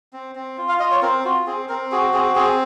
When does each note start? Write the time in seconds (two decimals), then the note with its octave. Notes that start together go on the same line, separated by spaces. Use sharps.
0.13 C4
0.35 C4
0.58 F4
0.69 F5
0.79 F4 D#5
0.91 C#5
1.02 C4 A#4
1.24 F4 F#4
1.47 C4 G#4
1.68 C4 A#4
1.92 F#4 G#4
2.13 C4 G#4
2.35 C4 G#4